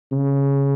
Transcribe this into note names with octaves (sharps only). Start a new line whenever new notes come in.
C#3